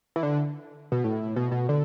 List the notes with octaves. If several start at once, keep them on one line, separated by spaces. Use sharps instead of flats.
E3
D3
B2
A2
B2
B2
D3